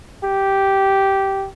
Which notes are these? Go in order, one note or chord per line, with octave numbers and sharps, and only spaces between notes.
G4